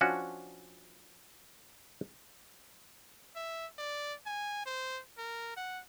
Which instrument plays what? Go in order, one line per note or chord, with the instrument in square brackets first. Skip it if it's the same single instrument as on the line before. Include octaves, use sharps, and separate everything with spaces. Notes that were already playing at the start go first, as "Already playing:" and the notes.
[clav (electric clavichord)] F3 C#4 D4 F#4
[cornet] E5
D5
G#5
C5
A#4
F#5